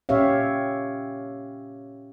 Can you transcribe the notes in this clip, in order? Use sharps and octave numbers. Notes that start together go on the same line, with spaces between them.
A#2 C#4 G4 C#5 E5 F5